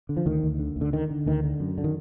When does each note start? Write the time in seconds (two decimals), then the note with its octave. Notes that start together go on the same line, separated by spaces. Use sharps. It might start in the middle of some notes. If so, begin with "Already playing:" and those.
0.09 D3
0.17 F3
0.26 D2 D#3
0.43 D2
0.59 D3
0.76 D2
0.81 D3
0.93 D3 D#3
1.11 D3
1.26 D2 D#3
1.44 D3
1.60 F#2
1.78 D3
1.84 D#3